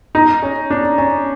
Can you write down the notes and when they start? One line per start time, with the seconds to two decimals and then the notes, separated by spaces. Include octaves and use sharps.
0.15 D#4
0.42 C#4
0.70 D4
0.98 C#4